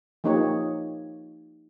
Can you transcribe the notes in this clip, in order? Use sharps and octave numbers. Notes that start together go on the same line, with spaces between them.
F3 A#3 D#4 G4 C#5